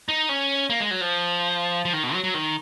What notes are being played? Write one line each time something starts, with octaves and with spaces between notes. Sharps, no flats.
D#4
C#4
A#3
G#3
F#3
F3
F3
D#3
B2
F#3
F#3
D#3